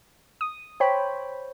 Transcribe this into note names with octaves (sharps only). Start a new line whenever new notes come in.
D#6
C5 C#5 G5 B5